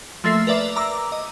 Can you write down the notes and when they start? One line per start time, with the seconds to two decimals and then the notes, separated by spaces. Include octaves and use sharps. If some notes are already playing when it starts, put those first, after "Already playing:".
0.24 F3 A3 A#3 E5 C7
0.47 A#4 B4 D5 E5 D6
0.76 A#5 D6 E6
1.12 D#5